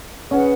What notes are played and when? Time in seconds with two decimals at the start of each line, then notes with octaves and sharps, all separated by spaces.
0.30 C#4 G#4 B4 F#5